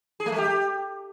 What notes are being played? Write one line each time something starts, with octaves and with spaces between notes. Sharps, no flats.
G#4
A3
G#3
G4